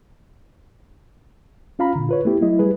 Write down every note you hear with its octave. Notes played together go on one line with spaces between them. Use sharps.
C#4 F4 F5 A#5 B5
A#2 D3
F4 B4 C#5
A3 B3 E4 G4
F#3 A3 E4 D#5
G3 G#4 B4